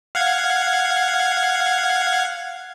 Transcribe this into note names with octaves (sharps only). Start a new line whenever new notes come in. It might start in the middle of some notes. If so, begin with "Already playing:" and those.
F5 F#5 G#6